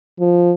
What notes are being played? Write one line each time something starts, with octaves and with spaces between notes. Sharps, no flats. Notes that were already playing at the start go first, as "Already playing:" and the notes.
F3